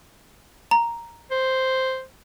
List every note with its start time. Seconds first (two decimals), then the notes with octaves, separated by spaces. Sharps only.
0.71 A#5
1.31 C5